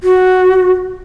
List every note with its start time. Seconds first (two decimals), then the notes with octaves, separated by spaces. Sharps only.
0.03 F#4